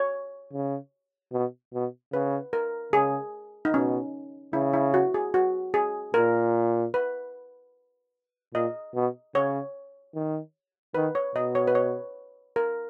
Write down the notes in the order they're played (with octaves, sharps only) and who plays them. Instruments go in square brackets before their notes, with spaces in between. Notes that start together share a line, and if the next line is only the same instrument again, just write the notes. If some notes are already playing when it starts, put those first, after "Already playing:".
Already playing: [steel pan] C#5
[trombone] C#3
B2
B2
[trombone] C#3 [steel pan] B4
[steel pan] A#4
[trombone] C#3 [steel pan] G#4
[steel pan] D#4
[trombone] B2 [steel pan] C#4
[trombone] C#3 [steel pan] E4
[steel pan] E4
F#4
G#4
F#4
G#4
[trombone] A#2 [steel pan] A#4
[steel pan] B4
[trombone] A#2 [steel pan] D#5
[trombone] B2
[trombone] C#3 [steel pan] C#5
[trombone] D#3
[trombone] D#3 [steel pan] B4
[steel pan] C#5
[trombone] B2 [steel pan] D#5
[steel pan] C#5
B4
C#5
A#4